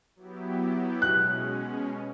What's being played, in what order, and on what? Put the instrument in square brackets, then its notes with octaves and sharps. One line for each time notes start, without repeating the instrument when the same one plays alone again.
[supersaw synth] F#3 B3 E4 G4
[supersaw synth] B2 G#3 C#4 [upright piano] F#6